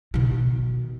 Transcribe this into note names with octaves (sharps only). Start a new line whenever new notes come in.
B2 D#3